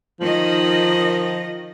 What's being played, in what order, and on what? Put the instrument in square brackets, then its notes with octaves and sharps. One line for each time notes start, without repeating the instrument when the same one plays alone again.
[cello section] D#3 D#5 [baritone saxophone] F3